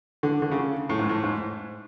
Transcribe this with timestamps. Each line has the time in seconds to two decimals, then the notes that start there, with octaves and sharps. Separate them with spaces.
0.23 D3
0.42 D3
0.51 C#3
0.89 A2
0.99 G#2
1.09 A2
1.24 G#2